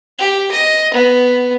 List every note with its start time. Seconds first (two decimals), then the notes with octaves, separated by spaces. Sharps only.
0.19 G4
0.51 D#5
0.93 B3